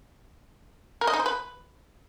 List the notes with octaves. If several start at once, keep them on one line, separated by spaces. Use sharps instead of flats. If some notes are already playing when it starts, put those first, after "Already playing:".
A#4
D#5
D#4
C5
B4